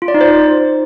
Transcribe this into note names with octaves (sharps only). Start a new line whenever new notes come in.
F4
D5
D#4
C5